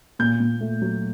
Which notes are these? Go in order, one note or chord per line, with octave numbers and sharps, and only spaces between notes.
A#2 G6
A#2
A3
F#3